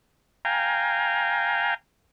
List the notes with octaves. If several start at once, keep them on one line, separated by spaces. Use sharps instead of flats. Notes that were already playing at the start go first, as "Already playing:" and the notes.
F5 G5 G#5 A#5